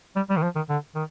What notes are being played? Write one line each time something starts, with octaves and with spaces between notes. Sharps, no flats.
G3
G3
D#3
F3
D#3
D3
D#3